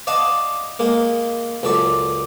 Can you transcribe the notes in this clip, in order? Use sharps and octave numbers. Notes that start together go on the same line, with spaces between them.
D5 D#5 F5 F#5 A5
G#3 A#3
C#2 F#2 A4 D5 C#6